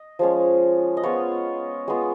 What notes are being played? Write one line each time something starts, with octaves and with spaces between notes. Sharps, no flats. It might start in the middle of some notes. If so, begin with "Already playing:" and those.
Already playing: D#5
F3 G#3 C#4
D#5
G#3 B3 F4 C#5
G#3 B3 F4